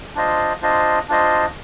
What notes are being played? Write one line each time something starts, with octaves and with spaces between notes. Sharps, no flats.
D4 F4 C5 D#5
D4 F4 C5 D#5
D4 F4 C5 D#5